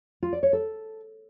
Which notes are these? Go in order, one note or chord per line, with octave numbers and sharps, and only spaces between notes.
F4
D5
C#5
A4